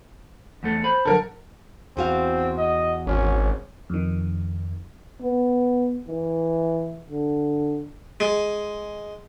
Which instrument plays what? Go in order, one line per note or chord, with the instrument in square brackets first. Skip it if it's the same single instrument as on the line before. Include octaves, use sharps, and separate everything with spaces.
[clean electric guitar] E2 A3 A4
C5 B5
[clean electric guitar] D3 D#3 F#3 [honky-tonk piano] A4 A#4
[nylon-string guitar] E2 F#4 F5 [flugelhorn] C4
[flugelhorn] D#5
[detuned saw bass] G#1 [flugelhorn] C#4
[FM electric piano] F2 D#3
[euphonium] B3
E3
D3
[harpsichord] G#3